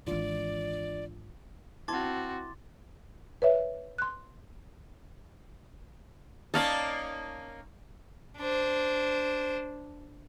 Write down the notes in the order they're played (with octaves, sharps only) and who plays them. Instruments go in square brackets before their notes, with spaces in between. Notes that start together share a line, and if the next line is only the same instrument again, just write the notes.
[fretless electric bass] D1 G#1 [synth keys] E3 D4 F4 [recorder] D5
[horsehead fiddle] C4 F#4 [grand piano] E4 A5 G#6 [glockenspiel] C6 D6 A6
[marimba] B4 C#5 E5
C6 F#6
[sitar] A#3 C#4 D#4 [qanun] D5 F5 A5
[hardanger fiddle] D4 C5